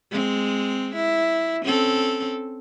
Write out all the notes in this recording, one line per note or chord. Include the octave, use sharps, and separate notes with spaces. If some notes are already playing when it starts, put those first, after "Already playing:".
G#3 C4
E4
C4 C#4 A4